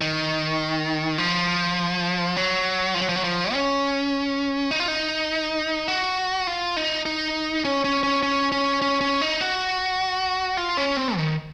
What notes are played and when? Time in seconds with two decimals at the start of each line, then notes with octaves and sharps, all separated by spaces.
0.01 D#3
1.18 F3
2.36 F#3
2.94 F3
3.02 F#3
3.09 F3
3.16 F#3
3.24 F3
3.53 C#4
4.71 D#4
4.80 F4
4.88 D#4
5.88 F#4
6.47 F4
6.76 D#4
7.06 D#4
7.65 C#4
7.84 C#4
8.03 C#4
8.23 C#4
8.52 C#4
8.82 C#4
9.01 C#4
9.21 D#4
9.41 F#4
10.57 F4
10.77 C#4
10.97 C4
11.17 D#3